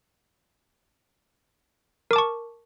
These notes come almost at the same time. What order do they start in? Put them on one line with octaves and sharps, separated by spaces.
A#4 D6 A5 C#6